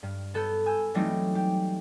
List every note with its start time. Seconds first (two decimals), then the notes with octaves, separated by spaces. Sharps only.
0.03 G2
0.34 B3 A4 G6
0.66 G#5 E6 G6
0.94 E3 F#3 G3 A3 C4 D#4
1.35 G4